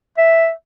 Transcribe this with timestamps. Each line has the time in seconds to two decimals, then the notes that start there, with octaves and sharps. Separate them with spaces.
0.18 E5